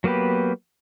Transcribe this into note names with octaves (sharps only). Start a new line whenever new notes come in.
F#3 A#3 B3 G4 B4